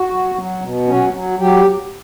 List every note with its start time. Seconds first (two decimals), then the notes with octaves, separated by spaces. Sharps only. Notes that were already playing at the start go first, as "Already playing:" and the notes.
Already playing: F#4
0.10 F#3
0.35 F#3
0.61 B2
0.87 F#3 C#4
1.13 F#3
1.39 F#3 G4